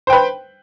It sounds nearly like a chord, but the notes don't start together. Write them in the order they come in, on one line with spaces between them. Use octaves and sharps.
C5 G5 B4